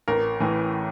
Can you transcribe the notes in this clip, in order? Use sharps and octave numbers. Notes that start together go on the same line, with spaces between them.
A1 A#4
A2 E3